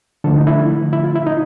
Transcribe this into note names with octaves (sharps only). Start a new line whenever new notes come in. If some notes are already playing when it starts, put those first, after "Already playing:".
D3 F3 A3 A4
D#4
E4
E4
F4
E4
D#4